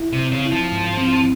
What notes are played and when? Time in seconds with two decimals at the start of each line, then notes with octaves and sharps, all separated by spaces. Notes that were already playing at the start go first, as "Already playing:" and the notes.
Already playing: E4
0.13 C3
0.19 C4
0.32 C#3
0.45 E4
0.52 F3
0.72 G#2
0.97 C4